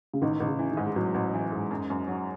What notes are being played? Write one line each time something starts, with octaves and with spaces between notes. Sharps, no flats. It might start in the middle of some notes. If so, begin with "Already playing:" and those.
C#3
A1 D#3
A1 D#3
C#3
E3
D#3
G#2
G#3
A1 F#3
A1
E3
G#2
F#2
F#2
F#3